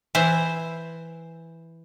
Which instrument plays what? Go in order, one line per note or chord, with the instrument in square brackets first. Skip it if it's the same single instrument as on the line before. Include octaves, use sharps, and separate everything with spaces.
[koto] E3 E4 C5